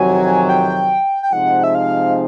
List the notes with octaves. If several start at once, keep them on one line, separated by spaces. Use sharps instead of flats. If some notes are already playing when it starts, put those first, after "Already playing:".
Already playing: F2 C3 D#3 F#3 G#5
G5
G5
C3 F3 G#3 C4 D#4 F#5
E5
F5